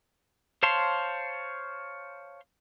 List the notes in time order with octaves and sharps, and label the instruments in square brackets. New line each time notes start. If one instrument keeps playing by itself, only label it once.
[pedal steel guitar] C5 C#5 F5 A5 C6